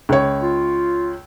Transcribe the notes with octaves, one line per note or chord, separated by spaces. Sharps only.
C#2 C#5
F4